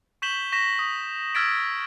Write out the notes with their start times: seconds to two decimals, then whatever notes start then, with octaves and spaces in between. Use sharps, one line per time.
0.22 C#6 G6 B6 E7 F#7 G7
0.52 C#6 A#6 B6 E7
0.79 D#6
1.35 E6 F6 G#6 A6 B6 D7